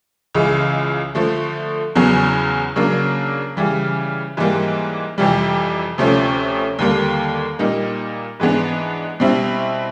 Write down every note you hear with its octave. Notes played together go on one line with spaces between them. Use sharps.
C#2 C#3 E3 G#3
D3 F3 A3
E2 C#3 F#3 B3
C#3 F#3 A#3 D4
C#3 E3 G3
G#2 E3 G3 A#3
F2 C3 E3 G3
D2 C3 F3 A3 C#4
D#2 D3 G3 A#3
A#2 G3 A#3 D#4
G#2 E3 G#3 B3 D4
B2 G3 C4 E4